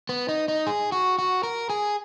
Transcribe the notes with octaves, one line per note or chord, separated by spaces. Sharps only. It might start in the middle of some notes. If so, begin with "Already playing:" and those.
B3
D#4
D#4
G#4
F#4
F#4
A#4
G#4